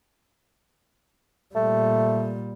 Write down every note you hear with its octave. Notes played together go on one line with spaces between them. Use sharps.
A#2 G3 A3